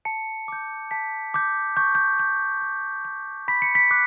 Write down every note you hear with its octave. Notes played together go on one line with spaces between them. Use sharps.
A5 C#7
D6 G6
A5 B6
D6 G6
C#6 G6
G6
G6
C#6
G6
B5 B6
C#7
B6
D6 F#6